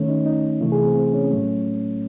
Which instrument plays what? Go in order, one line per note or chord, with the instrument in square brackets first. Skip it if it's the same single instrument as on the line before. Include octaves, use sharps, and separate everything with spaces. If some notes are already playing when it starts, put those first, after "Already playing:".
Already playing: [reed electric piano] D#3 A3 C#4
D#4
D#4
C3 E3 A3 E4
G#4
C4
C4
C#4
A2 F#3 A3